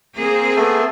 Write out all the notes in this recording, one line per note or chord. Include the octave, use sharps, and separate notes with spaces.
A#3 C4 G#4
A3 B3 A4